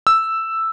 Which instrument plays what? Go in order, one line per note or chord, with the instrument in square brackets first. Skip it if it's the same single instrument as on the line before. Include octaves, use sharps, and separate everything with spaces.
[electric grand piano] E6